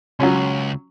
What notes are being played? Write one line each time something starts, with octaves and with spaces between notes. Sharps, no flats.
C#2 F#3 C#4